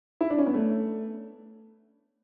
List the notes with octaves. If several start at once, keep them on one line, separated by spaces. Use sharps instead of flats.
E4
D4
C#4
B3
A3